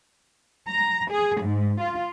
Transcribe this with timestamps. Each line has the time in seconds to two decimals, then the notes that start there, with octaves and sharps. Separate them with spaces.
0.68 A#5
1.10 G#4
1.41 G#2
1.80 F4